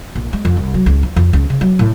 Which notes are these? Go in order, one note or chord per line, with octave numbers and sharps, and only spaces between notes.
A#1
G#3
F2
C2
F#3
C#2
F3
F2
C#2
C#3
F#3
A2